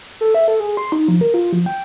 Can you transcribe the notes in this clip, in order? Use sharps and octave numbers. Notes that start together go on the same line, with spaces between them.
A4
E5
A4
G#4
C6
D#4
F3
A#4
F4
F3
G5